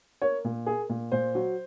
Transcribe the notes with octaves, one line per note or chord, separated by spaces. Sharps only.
A#3 C#5
A#2
A#3 G#4
A#2
A#2 C5
F#3